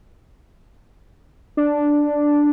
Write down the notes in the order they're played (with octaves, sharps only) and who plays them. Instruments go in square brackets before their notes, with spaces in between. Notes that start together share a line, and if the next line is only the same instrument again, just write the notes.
[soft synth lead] D4